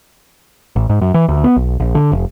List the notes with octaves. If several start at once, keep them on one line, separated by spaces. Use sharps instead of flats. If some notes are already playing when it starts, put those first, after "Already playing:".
A1
G#2
F#2
E3
D2
B3
B1
A#1
D3
F1